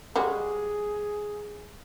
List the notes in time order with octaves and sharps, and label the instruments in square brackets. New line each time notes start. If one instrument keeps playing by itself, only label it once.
[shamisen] G3 G#3 F#4 [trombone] G#4